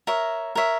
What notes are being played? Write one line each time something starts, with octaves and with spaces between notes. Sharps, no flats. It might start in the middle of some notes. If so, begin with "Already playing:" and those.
A#4 C#5 E5
A#4 C#5 E5